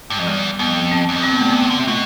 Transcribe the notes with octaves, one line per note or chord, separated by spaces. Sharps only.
G2
F2
E2 G3
F2 B3
C4
E2
F2
G2 C4
B3
A3
B3
D3
C3
B2 A3